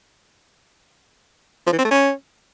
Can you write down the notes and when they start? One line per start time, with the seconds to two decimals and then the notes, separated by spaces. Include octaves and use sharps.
1.66 F3
1.73 E3
1.79 C4
1.85 A3
1.91 C#4